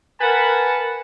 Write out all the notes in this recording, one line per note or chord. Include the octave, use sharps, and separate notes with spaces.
A#4 B4 F#5 G#5 A5 B5